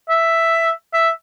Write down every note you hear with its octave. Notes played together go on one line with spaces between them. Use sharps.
E5
E5